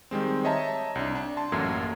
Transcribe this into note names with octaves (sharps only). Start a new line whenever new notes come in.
D#3 G3 G#3 C4
C#5 D#5 E5 A5 A#5
C2 D4
D4
A5 C6
A1 F#2 A3 A#3 G#6 C7